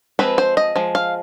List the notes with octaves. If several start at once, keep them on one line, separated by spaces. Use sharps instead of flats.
F3 G#3 C4 B4
C5
D#5
F3 G#3
F5